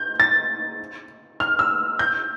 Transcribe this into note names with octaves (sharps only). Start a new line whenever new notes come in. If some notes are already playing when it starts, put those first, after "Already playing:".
Already playing: G6
A6
F6
E6
G6